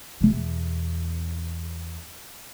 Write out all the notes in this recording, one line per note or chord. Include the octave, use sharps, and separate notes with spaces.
E2 B2